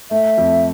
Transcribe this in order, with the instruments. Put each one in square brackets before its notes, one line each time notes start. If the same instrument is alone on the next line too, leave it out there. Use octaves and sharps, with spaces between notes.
[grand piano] A3 [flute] E5
[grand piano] F2